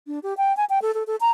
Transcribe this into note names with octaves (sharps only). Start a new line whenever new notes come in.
D4
G4
G5
G#5
G5
A4
A4
A4
A#5